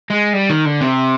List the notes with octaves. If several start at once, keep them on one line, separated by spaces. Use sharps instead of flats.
G#3
G3
D#3
D3
C3